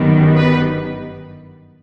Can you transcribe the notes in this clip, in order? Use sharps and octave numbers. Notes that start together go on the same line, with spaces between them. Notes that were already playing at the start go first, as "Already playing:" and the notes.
Already playing: G1 F#2 D#3 G3 B3
B4